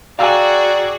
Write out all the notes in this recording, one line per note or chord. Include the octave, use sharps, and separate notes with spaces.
F#4 G#4 D5 F5 G5 G#5 A#5 E6